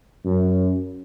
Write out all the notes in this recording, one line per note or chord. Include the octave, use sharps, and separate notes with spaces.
F#2